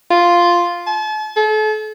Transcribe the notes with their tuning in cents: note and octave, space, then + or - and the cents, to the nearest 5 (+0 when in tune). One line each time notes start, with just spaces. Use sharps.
F4 +0
A5 -40
A4 -40